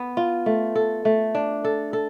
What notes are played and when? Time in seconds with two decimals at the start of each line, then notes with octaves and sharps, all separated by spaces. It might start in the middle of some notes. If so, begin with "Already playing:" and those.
Already playing: B3
0.17 F4
0.46 A3
0.76 A4
1.05 A3
1.35 D4
1.65 A4
1.93 A4